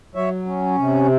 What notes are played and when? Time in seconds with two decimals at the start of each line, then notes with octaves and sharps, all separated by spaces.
0.15 F#3 C#5 E5
0.46 C#4
0.78 C3